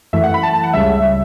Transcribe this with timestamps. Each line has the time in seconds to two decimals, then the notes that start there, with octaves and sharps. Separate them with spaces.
0.13 F#2 E3 A3 E5
0.23 F#5
0.34 B5
0.43 A5
0.53 A5
0.63 F#5
0.73 C#2 C#3 G3 E5